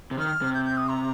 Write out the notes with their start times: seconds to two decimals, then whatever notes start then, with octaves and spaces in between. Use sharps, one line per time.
0.11 C3
0.18 D#3 F6
0.42 C3
0.54 G6
0.65 G6
0.77 D#6
0.88 A#5